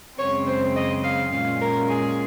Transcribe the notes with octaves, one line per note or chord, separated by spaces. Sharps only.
F#2 C#3 G#3 C4 C#5
C5
D#5
F5
A#2 G#3 C#4 F5
A#4
G#4